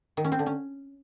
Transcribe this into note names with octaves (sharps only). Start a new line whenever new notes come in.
D#3
C#4
C4
D3
C#4